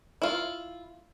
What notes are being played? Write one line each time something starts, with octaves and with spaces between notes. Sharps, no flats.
E4 F4